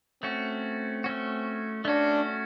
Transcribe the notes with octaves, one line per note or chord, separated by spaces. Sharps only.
A3 C4 C#4 F#4
A3 C#4 F#4
A3 C#4 D4 F#4